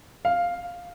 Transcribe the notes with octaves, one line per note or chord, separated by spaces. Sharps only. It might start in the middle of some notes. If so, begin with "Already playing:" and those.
F5